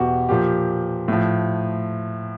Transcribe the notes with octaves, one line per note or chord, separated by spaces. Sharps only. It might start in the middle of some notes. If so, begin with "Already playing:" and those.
Already playing: E2 B2 F#4 G4
A#2 F3 G4
A2 F3